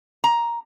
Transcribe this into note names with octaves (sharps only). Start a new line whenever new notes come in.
A#5